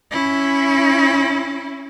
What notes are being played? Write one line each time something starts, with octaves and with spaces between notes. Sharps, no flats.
C#4 E4